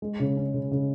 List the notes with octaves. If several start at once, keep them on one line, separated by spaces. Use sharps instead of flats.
G#3
C#3
C#4
C#3
C#3